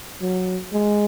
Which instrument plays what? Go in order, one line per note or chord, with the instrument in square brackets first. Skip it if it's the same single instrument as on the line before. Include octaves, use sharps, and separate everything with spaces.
[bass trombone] F#3
G#3